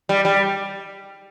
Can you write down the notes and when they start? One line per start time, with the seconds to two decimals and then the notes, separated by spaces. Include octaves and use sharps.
0.09 G3
0.25 G3